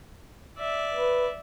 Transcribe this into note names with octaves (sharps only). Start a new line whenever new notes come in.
D5 E5
B4